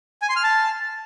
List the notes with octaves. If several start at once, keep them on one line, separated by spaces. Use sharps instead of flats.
G#5
C6
F6
A5